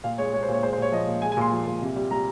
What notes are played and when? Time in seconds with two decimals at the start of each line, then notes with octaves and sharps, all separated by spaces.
0.04 A#2 F5
0.18 G#3 C#5
0.33 G#3 C#5
0.43 C5
0.48 A#2 C#5
0.63 G#3 C5
0.73 C5
0.78 A#2 C#5
0.92 F3 D#5
1.07 A#2
1.22 G#3 G#5
1.32 G#5
1.37 A#2 C6
1.51 F3
1.66 A#2
1.81 C3
1.96 G3
2.11 G3 A#5